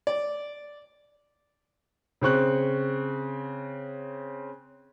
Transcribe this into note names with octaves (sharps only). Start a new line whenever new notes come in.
D5
C#3 C4 C#6 F#6